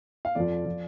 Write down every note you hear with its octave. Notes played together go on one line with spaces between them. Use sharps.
F5
F2 F3 D5
F3